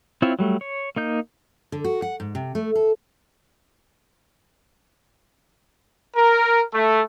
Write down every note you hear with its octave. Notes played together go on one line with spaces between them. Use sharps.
C4 E4 F4 C#5 E5
F#3 G3 A3
C#5
A#3 D#4 G6
D3
F#4
F#5
G#2
C3
A3
A4
A#4
A3